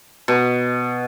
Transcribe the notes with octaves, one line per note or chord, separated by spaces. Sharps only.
B2